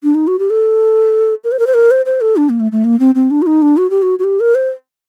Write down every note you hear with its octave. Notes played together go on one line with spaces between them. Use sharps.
D4
D#4
F#4
G4
A4
A#4
C5
A#4
C5
A#4
C5
C5
A4
D4
A#3
A3
A3
A#3
C4
C4
D4
F#4
D#4
D4
F#4
G4
F#4
F#4
G4
A#4
C5